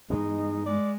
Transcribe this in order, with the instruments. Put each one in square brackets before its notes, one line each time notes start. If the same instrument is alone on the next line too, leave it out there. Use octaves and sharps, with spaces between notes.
[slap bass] G2 E3 B3 [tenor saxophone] G#3 [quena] D#4
[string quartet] G#3 [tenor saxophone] D5